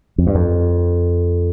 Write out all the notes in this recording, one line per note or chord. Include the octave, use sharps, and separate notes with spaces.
F2
G2
F2